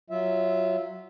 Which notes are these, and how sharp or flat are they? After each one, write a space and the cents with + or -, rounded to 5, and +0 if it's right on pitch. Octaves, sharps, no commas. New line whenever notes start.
F#3 +0 F4 -20 E5 -10